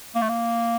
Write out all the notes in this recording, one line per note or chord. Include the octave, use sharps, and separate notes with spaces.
A#3
A3
A#3